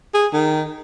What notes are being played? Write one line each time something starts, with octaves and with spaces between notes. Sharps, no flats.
G#4
D#3